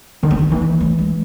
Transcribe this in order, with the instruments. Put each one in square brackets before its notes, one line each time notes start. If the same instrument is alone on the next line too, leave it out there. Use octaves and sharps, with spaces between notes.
[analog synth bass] D#3 [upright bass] B3
[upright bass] C4
B3
[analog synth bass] E3 [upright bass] A#3
[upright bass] A3
G#3